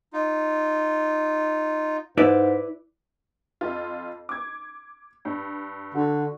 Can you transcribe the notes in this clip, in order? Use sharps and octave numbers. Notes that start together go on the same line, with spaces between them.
D#4 F4
G#2 E4 B4 D5
F2 F4
D6 G#6
G2
D3 F#4